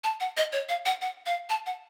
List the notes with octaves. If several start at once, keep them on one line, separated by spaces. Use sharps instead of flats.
A5
F#5
D#5
C#5
F5
F#5
F#5
F5
A5
F#5